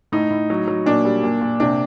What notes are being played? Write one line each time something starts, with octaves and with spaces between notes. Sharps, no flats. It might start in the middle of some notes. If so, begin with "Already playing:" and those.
A2 D#4
A2
F#3
F#3
A#2 D4
G3
A#2
A#2
C3 D4